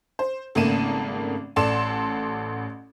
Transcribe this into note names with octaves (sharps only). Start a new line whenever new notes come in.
C5
G#1 C#3 A3 A#3 D#7 E7
A1 A4 D5 C6 E7